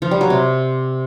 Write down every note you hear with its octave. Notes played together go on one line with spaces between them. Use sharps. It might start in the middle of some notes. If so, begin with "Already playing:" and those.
F3
G3
F#3
C3